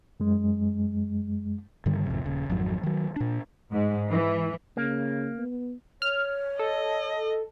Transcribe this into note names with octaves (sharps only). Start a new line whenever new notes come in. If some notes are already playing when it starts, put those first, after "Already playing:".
F#2 G#3
G2 D3 D#3 G3
G#1 F2 C3
D#1 C#3
G#1 F2 F#3
D#3 F#3
A#2 D4
G#2
E3
C#3 A#3
B3
C#5 F6
A4 D#5